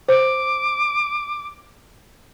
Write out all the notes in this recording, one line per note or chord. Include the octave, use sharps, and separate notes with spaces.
C5 D6